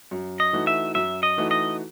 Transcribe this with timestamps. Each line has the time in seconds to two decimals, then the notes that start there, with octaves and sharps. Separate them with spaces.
0.11 F#2
0.40 D#5
0.53 E3 A3 D#4 F#4
0.67 E5
0.95 F#2 E5
1.23 D#5
1.37 E3 A3 D#4 F#4
1.51 D#5